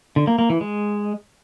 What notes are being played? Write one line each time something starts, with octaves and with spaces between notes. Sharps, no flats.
D3
A#3
A#3
E3
G#3